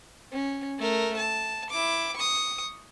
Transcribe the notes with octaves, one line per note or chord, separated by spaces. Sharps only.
C#4
A3 A#4
A5
E4 D6
C#6 D#6